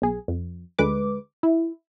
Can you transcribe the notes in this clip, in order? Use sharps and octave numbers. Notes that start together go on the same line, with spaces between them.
B1 G#4
F2
D2 D3 G#3 B4 D6
E4